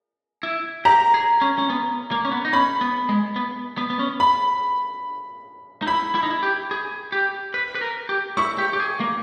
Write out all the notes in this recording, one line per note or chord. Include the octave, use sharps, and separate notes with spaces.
E4
G4 A#5
G#4
C#4
C#4
B3
A#3
C#4
B3
D#4
C#4 B5
B3
G#3
B3
B3
B3
C#4
B5
D#4
E4 B5
E4
D#4
E4
G4
G#4
G4
B4
B4
A#4
G4
E4 C#6
G4
G4
G#4
A#3